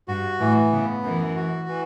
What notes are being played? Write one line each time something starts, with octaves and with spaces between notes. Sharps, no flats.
G2 F#4
A2 E3
C#3 B3
F#2 E3
F#4
E3